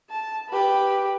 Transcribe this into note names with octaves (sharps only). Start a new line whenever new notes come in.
A5
G4 B4